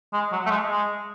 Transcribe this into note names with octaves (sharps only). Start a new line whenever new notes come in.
G#3
F#3
A3
G#3
G#3